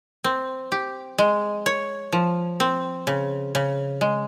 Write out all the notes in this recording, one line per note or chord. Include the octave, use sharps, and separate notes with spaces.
C4
G4
G#3
C#5
F3
C4
C#3
C#3
G#3